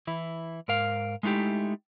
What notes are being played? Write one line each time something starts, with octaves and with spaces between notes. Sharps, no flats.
E3 E4
G#2 A#4 F5
G#3 A3 D#4 E4 G4